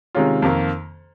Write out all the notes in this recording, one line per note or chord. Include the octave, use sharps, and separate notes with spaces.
C3 D#3 G#3 C#4 F4
F2 D#3 A#3